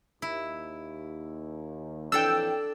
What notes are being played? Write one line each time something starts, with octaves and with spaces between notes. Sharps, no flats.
D#2 E4
F2 A2 E3 D4 A4 G5 E6